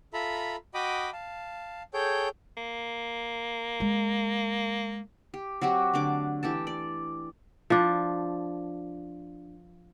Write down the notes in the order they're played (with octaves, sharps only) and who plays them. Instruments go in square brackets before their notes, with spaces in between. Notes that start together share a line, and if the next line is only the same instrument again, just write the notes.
[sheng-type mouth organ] F4 A4 E5 A#5 B5
F#4 D#5 G5 B5 D6 D#6
F5 A5
G#4 A4 C#5 G5 G6
[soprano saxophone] A#3
[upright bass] G#3
[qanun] G4
F#3 C4 F#4 G4
D3 A3 D4 D6
E3 G4 A4 A5
D5
[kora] F3 D4